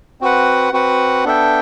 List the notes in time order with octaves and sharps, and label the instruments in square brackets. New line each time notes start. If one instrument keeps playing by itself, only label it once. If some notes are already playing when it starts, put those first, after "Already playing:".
[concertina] C4 F#4 B4 F#5
C4 F#4 B4 F#5
B3 D4 A4 E5 G5